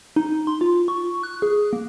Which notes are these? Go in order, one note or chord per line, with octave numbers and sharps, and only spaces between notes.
D#4
C6
F4
C#6
F#6
G#4
A#3